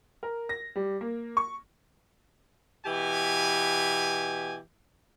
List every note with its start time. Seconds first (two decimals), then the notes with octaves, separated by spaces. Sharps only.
0.23 A#4
0.49 A#6
0.76 G3
1.01 A#3
1.37 C#6
2.85 B2 E3 G4 G#5